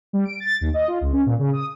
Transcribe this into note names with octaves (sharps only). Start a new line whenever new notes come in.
G3
D7
A6
D#2
D#5
F4
C#2
C#4
A#2
C#3
D#6